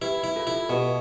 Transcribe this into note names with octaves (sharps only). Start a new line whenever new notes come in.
E4 G4 B4
E4
F4 A4
E4
B2 G4